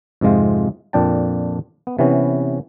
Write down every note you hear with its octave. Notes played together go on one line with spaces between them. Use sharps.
F2 G#2 C3 G#3 F4
F2 A#2 D4 G5 A5
B3
C3 E3 B3 C#4